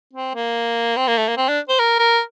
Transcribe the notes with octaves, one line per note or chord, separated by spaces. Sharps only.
C4
A#3
C4
A#3
A3
A#3
C4
D4
C5
A#4
A#4